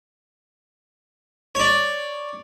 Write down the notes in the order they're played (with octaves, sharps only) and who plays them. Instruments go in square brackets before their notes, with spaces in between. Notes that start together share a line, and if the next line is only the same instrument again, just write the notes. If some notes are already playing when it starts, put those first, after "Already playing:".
[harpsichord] C#5 D5